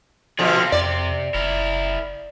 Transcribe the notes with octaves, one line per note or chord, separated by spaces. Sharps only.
B2 D3 D#3 F3 G#4
C3 C4
F2 D5
F#1 E4 A#4